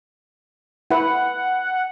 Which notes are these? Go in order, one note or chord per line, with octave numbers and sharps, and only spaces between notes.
E4 B4 F#5